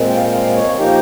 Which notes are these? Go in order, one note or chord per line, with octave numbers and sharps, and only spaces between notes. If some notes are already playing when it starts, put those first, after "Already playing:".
Already playing: A#2 G#3 C4
G5
F5
G5
F5
C#5
F3 A#3 D#4 G4